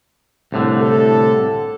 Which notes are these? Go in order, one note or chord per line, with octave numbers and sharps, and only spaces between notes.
C2 A2 D3
A4